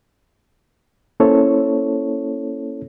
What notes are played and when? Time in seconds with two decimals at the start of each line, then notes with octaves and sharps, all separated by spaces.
1.20 A#3 C#4 E4 A4 C5 C#5